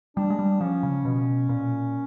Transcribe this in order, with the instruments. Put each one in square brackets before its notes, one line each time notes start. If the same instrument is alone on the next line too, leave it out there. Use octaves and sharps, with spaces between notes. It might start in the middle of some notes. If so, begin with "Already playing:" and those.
[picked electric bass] G3 [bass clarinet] D4
[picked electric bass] G#3
G3
[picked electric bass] F3 [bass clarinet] C#4
[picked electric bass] C#3
B2
A#2